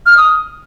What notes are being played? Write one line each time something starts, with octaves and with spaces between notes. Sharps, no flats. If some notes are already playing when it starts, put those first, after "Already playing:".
F6
D#6